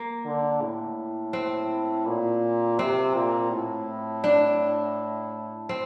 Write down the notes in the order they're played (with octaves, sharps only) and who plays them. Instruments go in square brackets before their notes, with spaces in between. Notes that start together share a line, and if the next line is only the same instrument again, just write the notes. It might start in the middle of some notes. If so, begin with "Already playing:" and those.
Already playing: [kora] A#3
[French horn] D3
A2
[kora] C4
[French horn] A#2
[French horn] C3 [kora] C4
[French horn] A#2
A2
[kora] D4
C4